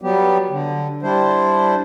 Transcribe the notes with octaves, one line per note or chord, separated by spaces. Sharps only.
F#3 G3 B3 G4
D3
G3 D4 E4 C5